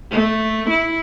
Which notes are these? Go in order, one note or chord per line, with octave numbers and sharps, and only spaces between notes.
A3
E4